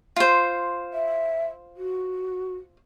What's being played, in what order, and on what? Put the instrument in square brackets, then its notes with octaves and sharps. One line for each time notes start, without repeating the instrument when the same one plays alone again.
[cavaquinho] F4 C5
[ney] E5
F#4